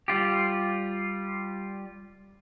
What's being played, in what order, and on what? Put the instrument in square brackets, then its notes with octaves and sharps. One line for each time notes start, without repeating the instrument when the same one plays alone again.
[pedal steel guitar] G3 F4 G4